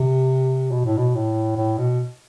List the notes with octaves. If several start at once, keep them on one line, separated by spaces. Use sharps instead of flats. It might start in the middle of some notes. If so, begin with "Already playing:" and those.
Already playing: C3
B2
A2
B2
A2
A2
B2